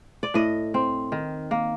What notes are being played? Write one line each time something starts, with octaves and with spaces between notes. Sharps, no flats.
D5
A2 D#5
C4
D#3
A#3